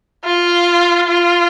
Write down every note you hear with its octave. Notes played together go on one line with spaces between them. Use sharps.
F4
F4